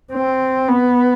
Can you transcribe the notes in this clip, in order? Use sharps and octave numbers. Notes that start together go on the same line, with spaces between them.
C4
B3